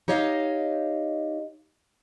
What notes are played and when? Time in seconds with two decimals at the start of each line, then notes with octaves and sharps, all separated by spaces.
0.08 D#4 G4 C#5 D#5 F5